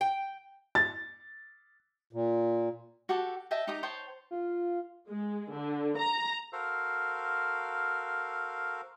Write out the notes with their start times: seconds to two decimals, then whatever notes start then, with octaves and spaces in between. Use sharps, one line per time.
0.01 G5
0.75 A6
2.13 A#2
3.09 F#4 G4 A4 A5
3.51 D#5 E5 G5 A5
3.67 D#4 G4 A#5 D#6
3.83 C5 C#5 G5 A5
4.31 F4
5.09 G#3
5.53 D3
5.97 A#5
6.53 F#4 A4 A#4 C5 F5